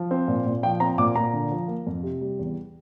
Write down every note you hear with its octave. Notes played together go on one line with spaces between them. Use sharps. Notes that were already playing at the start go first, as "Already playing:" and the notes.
Already playing: F3
C4
A#2
A#2
F3 G5
C4 A#5
A#2 D6
A#2 A#5
D3
F3
A#3
F2
C3
G3
E2